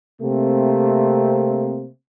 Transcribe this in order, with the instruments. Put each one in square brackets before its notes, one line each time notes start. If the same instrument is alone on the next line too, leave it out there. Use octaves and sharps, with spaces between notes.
[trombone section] C3 A3 A#3 C4